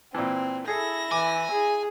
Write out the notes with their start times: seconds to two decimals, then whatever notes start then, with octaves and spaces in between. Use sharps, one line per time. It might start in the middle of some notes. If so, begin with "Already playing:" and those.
0.15 A#2 E3 C4
0.68 E4 G#4 A4 A#6
1.11 E3 G#5 D6
1.51 G#4